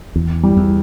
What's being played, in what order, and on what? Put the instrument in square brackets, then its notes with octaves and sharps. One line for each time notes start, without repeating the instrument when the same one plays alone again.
[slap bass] E2
[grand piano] G3
[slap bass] E2